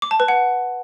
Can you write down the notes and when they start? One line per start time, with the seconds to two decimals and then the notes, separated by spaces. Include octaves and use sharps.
0.02 D6
0.11 A5
0.20 B4
0.28 F#5